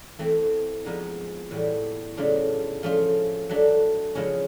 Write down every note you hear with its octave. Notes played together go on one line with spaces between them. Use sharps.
E3 A3 C4
F3 G#3 B3 D#4
A2 E3 G3 B3
C#3 F#3 A3 D4 F4
F3 A3 C#4 F4
F#3 A3 D4
C#3 F3 G#3 C#4 E4